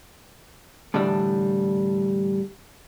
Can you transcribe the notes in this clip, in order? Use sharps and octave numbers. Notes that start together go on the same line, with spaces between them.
A2 D3 E3 G3 D4